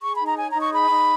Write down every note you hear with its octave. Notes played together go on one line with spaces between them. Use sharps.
G#4 C#6
B5
D#4
A#5
C#5 G#5
A#5
D#4
C#6
G#4 B5
D#4